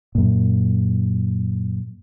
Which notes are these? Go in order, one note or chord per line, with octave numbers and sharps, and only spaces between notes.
F#2 A#2